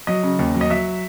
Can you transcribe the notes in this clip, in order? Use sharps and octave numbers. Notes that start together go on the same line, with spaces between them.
F#3 D#5
C#3
D#2
F#3
D#5
F#3 E5